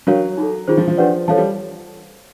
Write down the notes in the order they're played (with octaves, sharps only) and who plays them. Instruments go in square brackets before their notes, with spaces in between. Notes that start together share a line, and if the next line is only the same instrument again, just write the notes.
[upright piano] F#3 [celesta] D4 F#4 A#4 C#5 F5
[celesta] D#4 F#4 A4
[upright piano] D#3 [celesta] F4 G#4 C5
[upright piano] F3
F3
[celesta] D4 G4 B4 D5 F#5
[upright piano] F3 [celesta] A4 C#5 F5 A5
[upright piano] G3